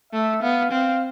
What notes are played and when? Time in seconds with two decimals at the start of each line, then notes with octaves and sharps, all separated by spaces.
0.13 A3 E5
0.42 B3 F5
0.71 C4 F5